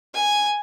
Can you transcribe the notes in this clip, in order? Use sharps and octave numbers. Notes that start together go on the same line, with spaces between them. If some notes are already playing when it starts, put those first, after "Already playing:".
G#5